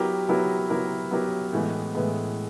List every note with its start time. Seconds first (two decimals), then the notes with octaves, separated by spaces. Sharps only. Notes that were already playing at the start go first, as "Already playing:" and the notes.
Already playing: F#3 B3 E4 G4 A#4
0.28 F#3 B3 E4 G4 A#4
0.69 F#3 B3 E4 G4 A#4
1.11 F#3 B3 E4 G4 A#4
1.53 A2 E3 G#3 B3
1.95 A2 E3 G#3 B3